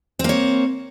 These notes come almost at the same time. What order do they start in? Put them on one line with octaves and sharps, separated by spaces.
C4 A#3 C#5